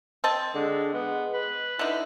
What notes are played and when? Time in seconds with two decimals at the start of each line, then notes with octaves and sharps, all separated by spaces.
0.24 C4 D#5 A5
0.54 D3 G#3
0.94 G#3 B3
1.33 B4
1.79 D3 D#4 E4